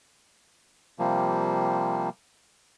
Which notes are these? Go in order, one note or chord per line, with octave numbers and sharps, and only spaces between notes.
C3 F3 G3 A#3